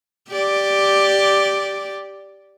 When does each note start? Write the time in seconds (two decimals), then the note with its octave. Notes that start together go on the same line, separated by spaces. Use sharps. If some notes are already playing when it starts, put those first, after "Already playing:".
0.29 G4 D5